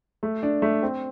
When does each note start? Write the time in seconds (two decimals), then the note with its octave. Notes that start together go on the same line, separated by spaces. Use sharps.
0.23 A3
0.43 D4
0.62 A3
0.82 C4